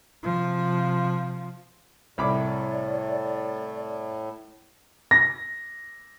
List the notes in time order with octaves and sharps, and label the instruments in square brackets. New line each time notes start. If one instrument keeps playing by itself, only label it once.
[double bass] C3 F3
[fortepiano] C2 B5 D6 [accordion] A2 [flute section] D5
[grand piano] A#6